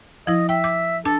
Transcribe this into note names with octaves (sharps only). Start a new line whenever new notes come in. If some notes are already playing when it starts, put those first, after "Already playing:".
F3 E4 D#5
E5 G5
D6
D4 A4 A5